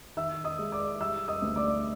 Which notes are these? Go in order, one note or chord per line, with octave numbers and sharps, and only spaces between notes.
D#3 E5 E6
D#5 D#6
G#3
D5 D6
G3 E5 E6
D#5 D#6
D2
D5 D6